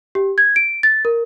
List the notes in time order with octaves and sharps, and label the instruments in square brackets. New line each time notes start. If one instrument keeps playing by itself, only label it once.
[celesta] G4
G#6
D7
A6
A#4